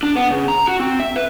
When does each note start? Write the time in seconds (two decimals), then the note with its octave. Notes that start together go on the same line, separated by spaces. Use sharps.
0.03 D4
0.15 B3
0.30 C#3
0.48 A#5
0.68 F#4
0.79 C4
1.00 E5
1.16 B4